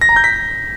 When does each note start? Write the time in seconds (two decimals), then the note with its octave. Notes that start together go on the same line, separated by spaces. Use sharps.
0.01 A#6
0.09 A#5
0.16 G6
0.24 B6